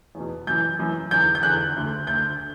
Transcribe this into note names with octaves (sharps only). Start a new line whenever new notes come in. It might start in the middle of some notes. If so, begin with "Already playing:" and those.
E2 B2
F#2 E3 G6
F#2 E3
E2 D3 G6
G6
E2 D3 F#6
D2 D3
D2 D3 G6